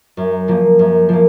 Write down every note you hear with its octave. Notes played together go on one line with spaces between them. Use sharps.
F#2
F3 A#3
F#2
F3 A#3